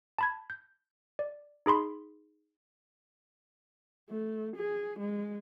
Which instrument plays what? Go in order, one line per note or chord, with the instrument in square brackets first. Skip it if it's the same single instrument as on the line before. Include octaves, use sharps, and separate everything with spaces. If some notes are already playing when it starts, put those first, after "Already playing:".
[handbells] A5 B5 G#6
G6
D5
D#4 G#4 B5 C6
[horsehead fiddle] A3
G#4
G#3